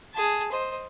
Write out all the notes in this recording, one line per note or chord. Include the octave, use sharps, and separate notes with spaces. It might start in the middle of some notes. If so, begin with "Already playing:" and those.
G#4 A5
C5 D#5